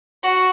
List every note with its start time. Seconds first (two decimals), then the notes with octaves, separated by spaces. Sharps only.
0.23 F#4